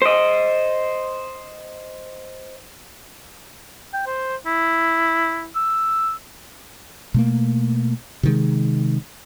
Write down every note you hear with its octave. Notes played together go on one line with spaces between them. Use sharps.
C5 D#5
G5
C5
E4
E6
B2 A3 A#3
C3 D#3 G#3